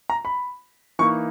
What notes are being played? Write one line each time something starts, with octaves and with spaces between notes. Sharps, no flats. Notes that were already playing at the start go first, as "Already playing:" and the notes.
A#5
B5
E3 A#3 D#4 C#6